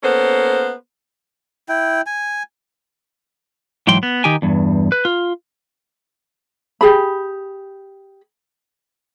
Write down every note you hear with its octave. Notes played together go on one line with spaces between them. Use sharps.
A#3 B3 C#4 A4 C5
E4 G5
G#5
G#2 E3 F#3 G5 C6
B3
D#3 D#4 G4 G5 G#5
E2 G2
B4
F4
G4 G#4 B5